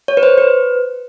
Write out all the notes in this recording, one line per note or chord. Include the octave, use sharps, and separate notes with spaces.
C#5
B4
C5
B4